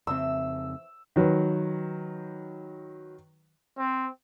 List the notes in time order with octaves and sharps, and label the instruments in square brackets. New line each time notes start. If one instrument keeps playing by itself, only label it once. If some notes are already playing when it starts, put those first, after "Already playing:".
[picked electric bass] F2 C#3 C4 [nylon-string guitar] E3 C5 E5 [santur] E6
[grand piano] D#3 F#3 B4
[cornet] C4